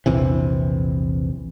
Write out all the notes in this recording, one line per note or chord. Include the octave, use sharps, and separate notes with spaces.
A#1 E2 C3 E3